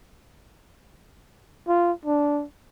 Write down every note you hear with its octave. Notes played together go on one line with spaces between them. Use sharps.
F4
D4